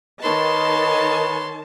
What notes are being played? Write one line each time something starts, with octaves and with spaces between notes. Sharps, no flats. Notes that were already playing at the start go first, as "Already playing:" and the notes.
D#3 B4 C#5 D#5 A5 C6